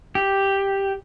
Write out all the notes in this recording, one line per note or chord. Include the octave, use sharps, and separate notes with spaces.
G4